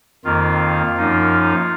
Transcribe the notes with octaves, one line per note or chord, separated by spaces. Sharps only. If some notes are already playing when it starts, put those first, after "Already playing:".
F2 D#3 A#3 F4
F#2 F3 A#3 D#4